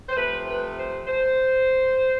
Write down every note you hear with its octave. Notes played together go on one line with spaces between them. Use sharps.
C5
C3 F3 A3 B4
B4
C5
C5